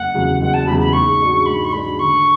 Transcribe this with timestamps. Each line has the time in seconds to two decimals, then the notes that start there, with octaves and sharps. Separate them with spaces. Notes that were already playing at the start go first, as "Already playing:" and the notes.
Already playing: F#1 F#5
0.14 E2 C#3 F#3
0.41 F#1 F#5
0.54 A5
0.67 E2 C#3 F#3 B5
0.80 B5
0.93 G#2 C#6
1.20 G#3 D4 F#4
1.46 G#2 B5
1.65 C#6
1.73 G#3 D4 F#4 B5
1.99 D3 C#6